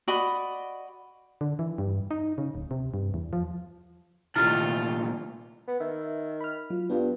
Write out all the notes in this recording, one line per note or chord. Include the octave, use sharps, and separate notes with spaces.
F#4 D5 D#5 B5
D3
E3
G2
D#4
C#3
D1
C3
G2
E2
F3
C2 A#2 D#3 A3 E4 F4 F6 A6
B3
D#3 E5
B5 F6
F#3 F4
G2 B3 D4 F4